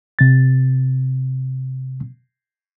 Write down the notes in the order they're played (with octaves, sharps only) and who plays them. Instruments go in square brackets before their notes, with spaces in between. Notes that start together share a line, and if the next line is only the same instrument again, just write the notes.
[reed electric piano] C3 A6